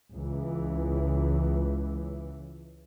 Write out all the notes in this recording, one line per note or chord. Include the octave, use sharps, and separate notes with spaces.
C#2 E3